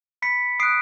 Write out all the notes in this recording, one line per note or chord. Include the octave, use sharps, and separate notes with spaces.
B5 B6 C#7
D#6 F#6 C7 D7